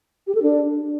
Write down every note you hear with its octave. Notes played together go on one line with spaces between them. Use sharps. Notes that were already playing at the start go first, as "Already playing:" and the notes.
G4
A4
D4